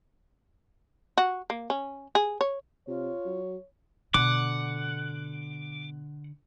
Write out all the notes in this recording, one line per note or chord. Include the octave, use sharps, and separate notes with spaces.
F#4
A#3
C#4
G#4
C#5
C3 F4 C#5
F#3
B2 D3 F#5 D6